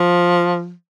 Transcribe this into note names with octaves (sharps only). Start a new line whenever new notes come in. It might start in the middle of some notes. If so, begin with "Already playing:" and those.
Already playing: F3